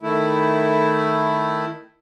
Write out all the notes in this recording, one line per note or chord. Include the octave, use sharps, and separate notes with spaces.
D#3 A3 E4